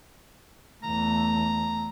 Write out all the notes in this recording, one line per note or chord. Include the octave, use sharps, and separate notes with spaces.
E2 A3 A#5